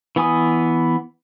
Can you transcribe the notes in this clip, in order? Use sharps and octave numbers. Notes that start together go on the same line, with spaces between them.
E3 B3 G#5 D#6